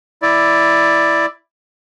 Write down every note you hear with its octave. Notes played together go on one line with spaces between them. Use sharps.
E4 D5